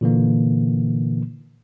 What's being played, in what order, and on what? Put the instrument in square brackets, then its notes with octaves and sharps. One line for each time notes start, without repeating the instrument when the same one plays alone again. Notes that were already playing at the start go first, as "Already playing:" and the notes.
[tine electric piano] A#2 D3 E3 A#3